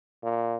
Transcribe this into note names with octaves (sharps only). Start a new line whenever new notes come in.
A#2